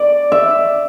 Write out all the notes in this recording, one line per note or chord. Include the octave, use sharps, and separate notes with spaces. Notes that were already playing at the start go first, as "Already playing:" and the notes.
Already playing: D5
E5